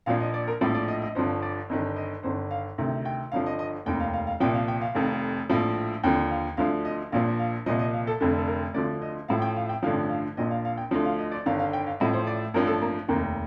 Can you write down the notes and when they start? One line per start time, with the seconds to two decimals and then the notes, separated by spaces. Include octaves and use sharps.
0.06 A#1 A#2 F3 F5
0.20 D#5
0.34 D5
0.47 A#4
0.61 A#1 A2 F3 D5
0.75 D5
0.88 D#5
1.02 D#5
1.15 G1 G2 F3 C5
1.42 D5
1.69 G1 G2 D#3 D#5
1.96 D#5
2.23 G1 G2 D#3 C5
2.51 F5
2.78 D2 C3 D#3
3.05 G5
3.32 G1 G2 F3 F5
3.46 D#5
3.59 D#5
3.86 F1 D#2 D#3 G5
4.00 F5
4.13 F5
4.27 F5
4.40 C2 A#2 F3 G5
4.54 F5
4.68 G5
4.81 F5
4.95 F1 F2 D#3
5.49 A#1 A2 F3
6.04 D#2 D3 F3 G5
6.31 F5
6.57 D2 D3 F3 F5
6.85 D#5
7.12 A#1 A#2 F3 F5
7.39 F5
7.66 C2 A#2 F3 D#5
7.79 D#5
7.94 F5
8.07 A4
8.20 F1 F2 D3 A4
8.38 A4
8.48 A#4
8.74 D2 D3 F3 D5
9.02 D#5
9.28 A1 A2 F3 F5
9.42 G5
9.56 F5
9.69 G5
9.83 A1 G2 D3 F3 F5
10.09 F5
10.37 A#1 A#2 F3 D#5
10.51 F5
10.65 F5
10.78 G5
10.91 D2 D3 F3
11.05 F5
11.19 D#5
11.32 D5
11.46 G1 G2 D#3 F5
11.59 F5
11.73 G5
11.87 F5
12.00 A1 A2 F3 D#5
12.13 C5
12.27 D5
12.54 A1 G2 F3 A#4
12.67 A4
12.81 A#3
13.08 F1 D#2 D#3 A#3